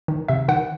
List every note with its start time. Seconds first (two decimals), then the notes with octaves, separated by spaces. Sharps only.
0.08 D#3
0.28 C3 E5
0.48 D#3 F#5